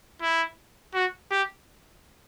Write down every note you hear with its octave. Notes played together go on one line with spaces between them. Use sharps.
E4
F#4
G4